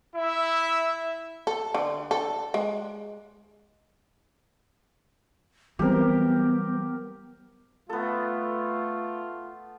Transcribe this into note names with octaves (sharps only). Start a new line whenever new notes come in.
E4 E5
A4
D3
A4
G#3
E3 F#3 G3 B3 C4 G4 A#4
A3 B3 F4 A4